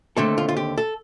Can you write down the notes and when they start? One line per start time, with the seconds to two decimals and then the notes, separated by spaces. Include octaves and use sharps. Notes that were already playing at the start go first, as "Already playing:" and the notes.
0.17 D#2 D3 A3 C4 A4
0.38 F4
0.48 F4
0.56 G4
0.78 A4